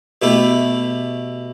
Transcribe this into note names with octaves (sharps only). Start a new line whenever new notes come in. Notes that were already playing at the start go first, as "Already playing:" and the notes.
B2 A3 E4 G4